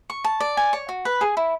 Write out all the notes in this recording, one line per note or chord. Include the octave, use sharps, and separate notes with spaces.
C#6
A5
D5
G#5
C#5
F#4
B4
G#4
E4